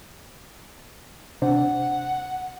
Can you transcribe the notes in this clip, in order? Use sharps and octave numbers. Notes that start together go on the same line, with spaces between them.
C3 D4 C5 F#5